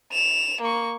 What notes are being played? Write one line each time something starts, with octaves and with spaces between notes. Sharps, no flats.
E7 F7
A#3 C#6